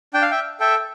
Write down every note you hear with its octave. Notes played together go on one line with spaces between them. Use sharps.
D4 G5
F5
E5 G5
A4 E5 G5